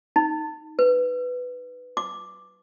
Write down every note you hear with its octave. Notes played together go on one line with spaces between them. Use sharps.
D#4
B4
D6